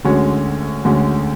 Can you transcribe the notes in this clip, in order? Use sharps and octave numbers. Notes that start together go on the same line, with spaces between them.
D2 D3 G#3 C#4 F#4
D2 D3 G#3 C#4 F#4